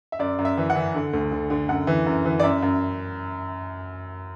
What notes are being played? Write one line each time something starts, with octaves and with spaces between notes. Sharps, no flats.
E5
F#2 D5
F#2
E5
E3
F#5
E3
D3
D2
D3
D3
F#2 F#5
E3
F#2
E3
D5
F#2 E5
F#2